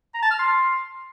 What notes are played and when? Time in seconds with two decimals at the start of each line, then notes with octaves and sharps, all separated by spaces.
0.14 A#5
0.23 A5
0.31 F6
0.39 C6